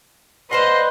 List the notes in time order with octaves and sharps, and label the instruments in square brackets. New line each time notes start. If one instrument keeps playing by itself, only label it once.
[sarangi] B4 [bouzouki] C5 F5 F#5 [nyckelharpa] D#5 [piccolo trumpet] C6